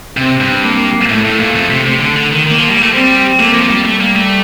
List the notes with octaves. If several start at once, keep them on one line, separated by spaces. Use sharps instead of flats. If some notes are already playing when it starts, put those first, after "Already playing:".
C3 C4
G2
A#3
A2 A3
A2
A#2
F2
C3
C3
D3
D3
D#3
D#3 A#3
F3
G3
A3
G3 C4
A3 A#3
F3
G3
G3 A3
A#3
A3